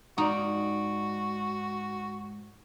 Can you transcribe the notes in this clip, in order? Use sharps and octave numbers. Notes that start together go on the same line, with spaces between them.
G#2 D#4 F#4 D5